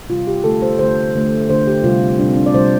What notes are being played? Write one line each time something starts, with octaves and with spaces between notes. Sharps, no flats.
C3 G3 F4
G4
D3 A3 A4
C5
D3 A3 C5
D3 A3
D3 A3 C5
G4
C3 G3 F4
C3 G3 D4
C4
D4
D5
C3 G3 C5